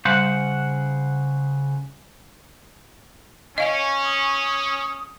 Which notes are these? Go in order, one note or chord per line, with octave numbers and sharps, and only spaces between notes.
C#3 G3 C5 F#5
C#4 D#5 F5 G#5
D#6